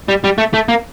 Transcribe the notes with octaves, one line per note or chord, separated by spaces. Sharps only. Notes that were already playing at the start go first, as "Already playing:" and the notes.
G3
G3
A3
A3
A#3